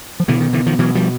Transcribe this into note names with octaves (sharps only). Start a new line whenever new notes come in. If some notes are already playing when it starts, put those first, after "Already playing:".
F3
B2 D3 E3
D#3
D3 E3
D#3 F3
B2 E3 F#3
F3 G3